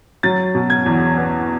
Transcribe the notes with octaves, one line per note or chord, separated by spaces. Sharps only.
F#3 A6
B2
G#6
E2
B3